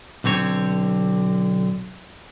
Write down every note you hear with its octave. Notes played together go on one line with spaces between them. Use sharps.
B1 D3 C4 C#5